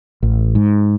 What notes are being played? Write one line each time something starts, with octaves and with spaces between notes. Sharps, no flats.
A1
G#2